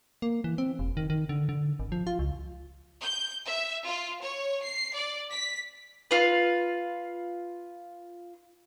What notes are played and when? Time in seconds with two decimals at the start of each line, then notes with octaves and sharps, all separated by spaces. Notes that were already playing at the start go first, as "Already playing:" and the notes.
0.22 A#3
0.44 E3
0.58 C4
0.79 F1
0.97 D#3
1.10 D#3
1.29 D3
1.49 D3
1.79 G#1
1.92 F3
2.07 F4
2.19 C#2
3.02 G6
3.47 E5
3.86 F4
4.23 C#5
4.63 C7
4.95 D5
5.32 B6
6.11 F4 B4